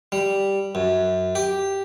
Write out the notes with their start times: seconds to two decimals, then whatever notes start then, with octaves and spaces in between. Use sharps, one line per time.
0.12 G3
0.75 F#2
1.35 G4